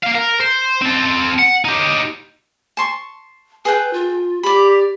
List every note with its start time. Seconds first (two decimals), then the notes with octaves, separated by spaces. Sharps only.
0.03 A#3 F5
0.15 A#4
0.41 C5
0.82 C4 A4
1.39 F#5
1.65 D#4 G4
2.77 A5 C6 C#6
3.65 G#4 A4 B4 G5
3.93 F4
4.43 G4 D5 B5